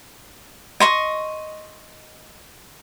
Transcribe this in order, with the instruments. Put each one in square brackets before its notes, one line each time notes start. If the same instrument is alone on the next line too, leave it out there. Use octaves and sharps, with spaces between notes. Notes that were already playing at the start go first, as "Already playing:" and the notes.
[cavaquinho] D#5 C6 C#6